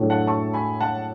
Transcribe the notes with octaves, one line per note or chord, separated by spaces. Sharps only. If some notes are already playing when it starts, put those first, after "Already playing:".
Already playing: A2 F#3 A3 D4 G#4
F#5 A5
A5 C#6
G#5 B5
F#5 A5